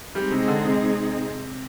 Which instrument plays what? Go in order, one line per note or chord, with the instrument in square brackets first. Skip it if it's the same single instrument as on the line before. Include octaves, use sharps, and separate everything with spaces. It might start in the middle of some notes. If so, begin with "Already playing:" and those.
[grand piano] G3 [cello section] G#3 C4 D#4 G#4
[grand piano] C3
D3
C3